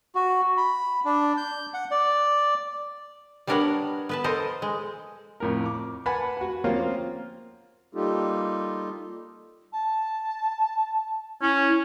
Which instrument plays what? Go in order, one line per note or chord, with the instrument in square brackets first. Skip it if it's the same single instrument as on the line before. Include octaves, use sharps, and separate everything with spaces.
[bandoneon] F#4
B5
D4
G6
F#5
D5
[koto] G3 B3 D4 A#4 C#5 F#5
B3 B4 A5
A4 A#4 C5 D#5
G#3
[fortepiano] F2 A2 A#4
D6
B4 F#5 G#5 A5 B5
F#4 F#5
F3 A#3 C4 C#4 F4
[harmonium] G3 A#3 D#4 F4 G4 A4
[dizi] A5
[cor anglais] C#4 [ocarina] E4 [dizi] C#5